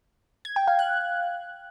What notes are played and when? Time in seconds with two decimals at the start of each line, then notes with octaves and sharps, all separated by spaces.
0.45 G#6
0.56 G5
0.68 F5
0.79 F#6